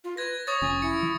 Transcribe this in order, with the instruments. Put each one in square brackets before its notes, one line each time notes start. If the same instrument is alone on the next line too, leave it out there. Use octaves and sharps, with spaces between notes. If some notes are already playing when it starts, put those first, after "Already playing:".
[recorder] F4
[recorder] B4 [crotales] G#6 A#6
[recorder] C#5 [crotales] C#6 D#6 A6
[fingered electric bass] F1 F3 C#4 [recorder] G#5
[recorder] E4 [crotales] C#7
[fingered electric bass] F3